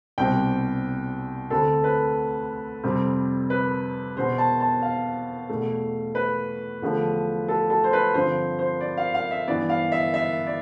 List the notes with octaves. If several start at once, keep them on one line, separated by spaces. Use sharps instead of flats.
C2 B2 G3 C4 G5
D2 D3 A3 C4 A4
B4
F2 C3 G3 C4
B4
E2 B2 B3 C5
A5
A5
F5
E2 B2 A3
B4
E2 D3 F3 A3
A4
A4
C5
B4
G2 D3 F3 C4 C5
C5
D5
F5
F5
E5
G2 E3 B3 D5
F5
E5
E5
D5